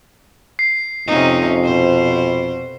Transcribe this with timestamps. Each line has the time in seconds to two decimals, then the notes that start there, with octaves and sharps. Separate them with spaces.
0.59 C7
1.07 F2 C3 C#4 D#4
1.64 B2 C5